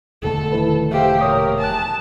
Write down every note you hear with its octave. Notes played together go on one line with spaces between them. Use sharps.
E1 D3 A3 A4
D#3 E4 B4
G4 C5 E5 F5 G5
A#2 A#4 C#5 D#6
G#5 A5 F#6